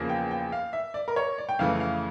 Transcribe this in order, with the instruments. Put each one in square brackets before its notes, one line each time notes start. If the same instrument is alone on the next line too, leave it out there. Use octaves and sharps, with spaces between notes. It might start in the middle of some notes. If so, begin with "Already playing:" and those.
Already playing: [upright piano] E2 C#3 F3 A#3
G5
G5
F5
E5
D5
A#4
C#5
D5
G5
F2 C#3 E3 A3 F5
F5